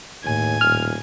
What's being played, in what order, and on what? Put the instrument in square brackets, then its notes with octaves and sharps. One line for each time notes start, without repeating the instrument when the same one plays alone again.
[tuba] D#2 [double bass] A2 [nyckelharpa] G#5
[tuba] D#1 [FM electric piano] F6